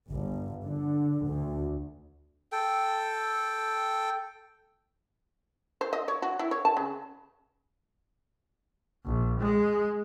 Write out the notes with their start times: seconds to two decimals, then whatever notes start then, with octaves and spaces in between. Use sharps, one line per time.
0.11 G1
0.66 D3
1.28 D2
2.52 A4 G5
5.81 C5
5.93 D#5
6.08 C#5
6.22 F#4
6.39 E4
6.51 C#5
6.65 A5
6.77 C#3
9.05 A#1
9.40 G#3